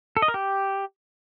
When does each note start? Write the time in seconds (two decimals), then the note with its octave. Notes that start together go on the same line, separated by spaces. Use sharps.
0.17 A4
0.22 D#5
0.28 A#4
0.34 G4